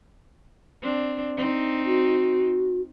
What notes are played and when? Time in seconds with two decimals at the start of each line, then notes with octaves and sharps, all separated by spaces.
0.82 C4 D4
1.37 C4 D#4
1.86 F#4